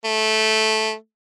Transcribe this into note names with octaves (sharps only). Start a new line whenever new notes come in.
A3